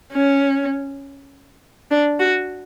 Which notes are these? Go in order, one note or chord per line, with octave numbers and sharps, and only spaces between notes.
C#4
D4
F#4